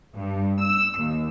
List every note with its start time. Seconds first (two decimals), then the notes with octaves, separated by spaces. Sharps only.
0.16 G2
0.63 E6
1.00 D#2